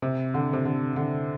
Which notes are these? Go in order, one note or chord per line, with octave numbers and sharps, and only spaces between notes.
C3
D3
C3
D3
D3